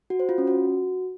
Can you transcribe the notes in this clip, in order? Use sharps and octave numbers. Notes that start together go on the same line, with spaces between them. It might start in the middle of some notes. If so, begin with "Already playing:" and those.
F#4
C5
F4
C#4
F#4